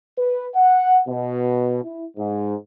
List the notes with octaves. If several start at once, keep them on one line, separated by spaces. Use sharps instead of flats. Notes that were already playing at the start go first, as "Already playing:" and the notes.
B4
F#5
B2
E4
G#2